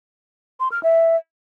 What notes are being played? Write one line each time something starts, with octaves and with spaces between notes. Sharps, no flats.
C6
F6
E5